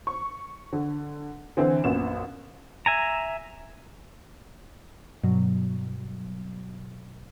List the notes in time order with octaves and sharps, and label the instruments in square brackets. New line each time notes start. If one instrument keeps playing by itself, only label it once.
[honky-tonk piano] C#6
D3
D3 E3 C4
A#1 F#2 B3 E7
[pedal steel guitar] E5 G#5 A#5
[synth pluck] G2 B2 F#3